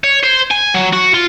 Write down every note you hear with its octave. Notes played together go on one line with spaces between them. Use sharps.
C#5
C5
G#5
F#3
F#4
F4